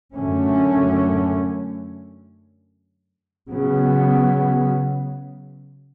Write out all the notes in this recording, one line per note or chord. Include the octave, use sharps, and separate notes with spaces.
F#2 D3 A3 C#4
C#3 F#3 B3